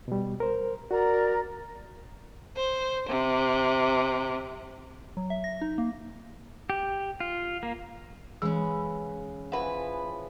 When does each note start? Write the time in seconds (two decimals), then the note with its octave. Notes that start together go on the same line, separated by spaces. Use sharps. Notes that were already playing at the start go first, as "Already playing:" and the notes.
0.08 B2 G3
0.40 A#4 C5
0.91 F#4 A#4 D5 A#5
2.57 C5
3.09 C3
5.17 F#3
5.30 E5
5.44 A#6
5.61 D#4
5.78 A#3
6.70 G4
7.20 F4
7.63 A#3
8.42 C#3 E3 G#3 C#4 B4
9.52 E3 F3 E4 B4 F#5